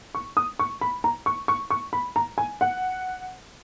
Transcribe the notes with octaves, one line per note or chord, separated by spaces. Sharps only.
C#6
D#6
C#6
B5
A#5
C#6
C#6
C#6
B5
A#5
G#5
F#5